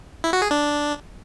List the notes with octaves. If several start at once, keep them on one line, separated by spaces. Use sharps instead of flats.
E4
F#4
G#4
D4